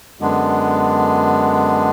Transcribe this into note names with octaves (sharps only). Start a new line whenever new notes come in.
F#2 D3 G#3 B3 D4